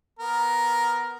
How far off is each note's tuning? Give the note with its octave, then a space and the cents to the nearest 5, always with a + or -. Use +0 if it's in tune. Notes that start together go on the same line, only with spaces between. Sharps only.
B3 +0 A#4 +10